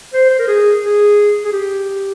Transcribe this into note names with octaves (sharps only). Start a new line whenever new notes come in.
C5
C5
A#4
G#4
G#4
G#4
G4